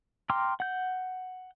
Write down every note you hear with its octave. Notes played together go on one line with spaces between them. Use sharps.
G5 A#5 C6 D6 F6
F#5 G6